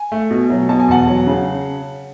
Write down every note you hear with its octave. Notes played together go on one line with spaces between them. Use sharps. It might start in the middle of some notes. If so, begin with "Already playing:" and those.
Already playing: G#5
A3
B2
F#3
B2 A5
G#5
E2 F#5 A5
F#3
C#3